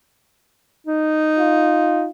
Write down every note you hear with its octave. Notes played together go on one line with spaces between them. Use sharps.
D#4
F4